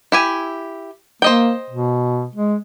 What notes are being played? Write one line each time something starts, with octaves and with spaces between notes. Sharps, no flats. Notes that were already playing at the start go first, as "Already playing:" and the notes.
E4 G4 G#5
A#3 C5 D#5 G5
B2
G#3